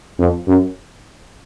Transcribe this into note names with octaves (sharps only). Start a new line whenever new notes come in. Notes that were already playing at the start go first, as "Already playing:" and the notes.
F2
F#2